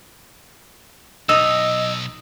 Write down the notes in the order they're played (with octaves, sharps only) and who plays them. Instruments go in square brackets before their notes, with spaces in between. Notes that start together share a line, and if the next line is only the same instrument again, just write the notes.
[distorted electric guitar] B1 [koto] D#4 [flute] D#5 [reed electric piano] E6